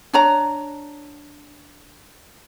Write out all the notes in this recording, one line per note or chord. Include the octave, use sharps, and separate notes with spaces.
D4 C#5 A#5